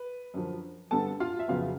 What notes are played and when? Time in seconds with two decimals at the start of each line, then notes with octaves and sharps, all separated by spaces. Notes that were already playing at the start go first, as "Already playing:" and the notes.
Already playing: B4
0.34 F#2 D3 F3
0.91 G2 D3 G3 B3 A4 A5
1.20 F4 F5
1.39 E5
1.48 F2 C#3 F#3 B3 F4 F5